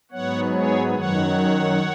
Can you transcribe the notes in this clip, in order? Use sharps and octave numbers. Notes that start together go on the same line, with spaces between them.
G#2 F#3 B3 C#5 F#5
G#4 C#5
F#2 D#3 F#3 C#5 F#5